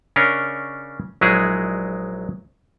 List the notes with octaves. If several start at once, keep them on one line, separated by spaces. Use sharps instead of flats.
C#3 C#4 D4 A#4 C#5 D#5
A#1 F#3 G#3 D#4 E4 G#4